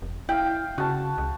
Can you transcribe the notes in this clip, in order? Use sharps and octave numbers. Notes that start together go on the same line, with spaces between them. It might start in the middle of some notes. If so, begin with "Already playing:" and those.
F1
E4 F5 G5
C#3 F#4 A5
C#2